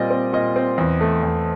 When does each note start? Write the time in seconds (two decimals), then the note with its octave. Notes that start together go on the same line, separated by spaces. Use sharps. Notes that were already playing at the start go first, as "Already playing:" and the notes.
Already playing: A#2 G3 C4 D5 D#5
0.11 C4
0.33 A#2 D#5
0.56 C4
0.78 E2
1.01 A3
1.23 E2